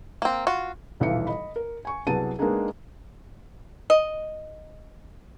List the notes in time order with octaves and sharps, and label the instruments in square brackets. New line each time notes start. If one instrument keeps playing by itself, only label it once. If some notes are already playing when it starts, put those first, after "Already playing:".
[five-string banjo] A#3 C4
F4 F#4
[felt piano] D#1 B1 E3 F4 E5 C#7
D#5 B5
A#4
G#5 C#6
C2 F#3 B3 G#4 A5 D#7
G#3 A#3 B3 D4 D#4 G#4
[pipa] D#5